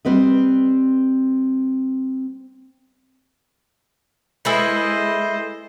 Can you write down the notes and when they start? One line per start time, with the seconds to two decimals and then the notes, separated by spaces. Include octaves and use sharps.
0.05 G3 C4 B4 D#5
4.45 G#3 E4 G#4 A4 B4 C5 D#5 E6